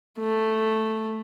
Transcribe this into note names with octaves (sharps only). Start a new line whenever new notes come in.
A3